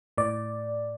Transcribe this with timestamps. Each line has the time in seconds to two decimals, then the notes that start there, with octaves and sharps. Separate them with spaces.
0.18 A2 D5